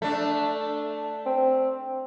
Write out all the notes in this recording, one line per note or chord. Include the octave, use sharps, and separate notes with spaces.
A3 D4
C4